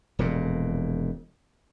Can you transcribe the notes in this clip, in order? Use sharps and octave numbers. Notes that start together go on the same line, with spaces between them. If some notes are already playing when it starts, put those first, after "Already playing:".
E1 F2 A#2